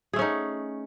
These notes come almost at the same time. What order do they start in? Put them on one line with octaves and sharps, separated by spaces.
G#4 A3 C#4 D#4